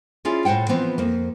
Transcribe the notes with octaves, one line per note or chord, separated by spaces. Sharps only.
C#4 E4 F4 G#4 D5
A2 C5 C#5 F#5 G5
E3 F3 B3 C4
F2 A#3